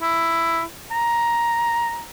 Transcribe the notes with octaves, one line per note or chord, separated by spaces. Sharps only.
E4
A#5